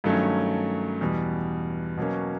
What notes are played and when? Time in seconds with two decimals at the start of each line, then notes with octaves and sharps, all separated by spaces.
0.04 G2 D#3 F#3 A3 C#4
1.01 E2 B2 G3
1.98 B2 F#3 A#3 C#4